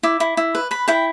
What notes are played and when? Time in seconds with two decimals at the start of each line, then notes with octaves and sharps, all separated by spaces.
0.03 E4 D6
0.20 E4
0.37 E4
0.55 B4
0.71 B4 B5
0.88 E4 G5